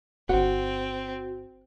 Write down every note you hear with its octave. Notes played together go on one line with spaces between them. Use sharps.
D1 G1 C4 F#4 F#5